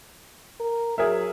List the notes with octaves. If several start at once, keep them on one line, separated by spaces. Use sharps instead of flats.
A#4
F#3 G#4 A#4 E5